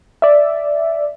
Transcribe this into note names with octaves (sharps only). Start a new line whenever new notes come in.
D5 E5